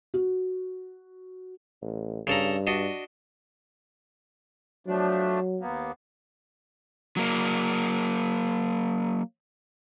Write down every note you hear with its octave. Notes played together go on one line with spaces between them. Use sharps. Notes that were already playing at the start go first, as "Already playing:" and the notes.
F#4
A1
G2 C#3 A4 A#5
D4 F#4 D#5
F3 F#3 A3 D4
D#2 A#3 B3
F#3 A#3